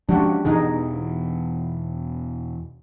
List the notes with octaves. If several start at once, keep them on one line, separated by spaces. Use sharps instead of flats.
F3 G#3 C#4 D4 F#4 G4
E2 B2 E3 D#4 G#4